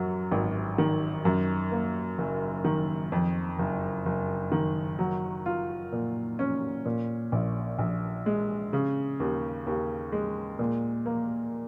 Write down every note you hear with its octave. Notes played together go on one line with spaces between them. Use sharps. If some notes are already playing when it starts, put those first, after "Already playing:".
Already playing: F#2 F#3
G#1
D#3
F#2
A#3
F#1
D#3
F2
F#1
F#1
D#3
F#3
F4
A#2
C#4
A#2
A#1
A#1
G#3
C#3
D#2
D#2
G#3
A#2
A#3